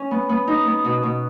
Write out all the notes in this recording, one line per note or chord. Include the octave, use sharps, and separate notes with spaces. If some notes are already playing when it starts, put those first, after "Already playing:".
Already playing: C#4
B3
B3
D#4
B3
B2
B2